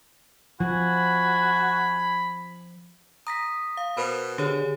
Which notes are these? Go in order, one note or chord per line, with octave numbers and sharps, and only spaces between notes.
F3 F#4 G#5 B5
A#5 D#6 A#6 B6
F5
B2 A#4 C5 B5
D3 G4 G#4 C#5